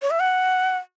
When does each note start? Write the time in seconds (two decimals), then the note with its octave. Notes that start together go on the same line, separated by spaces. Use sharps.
0.02 C#5
0.11 E5
0.20 F#5